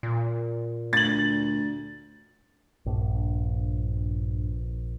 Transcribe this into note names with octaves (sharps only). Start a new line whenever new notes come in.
A#2
D2 A6 F#7
A#1 G2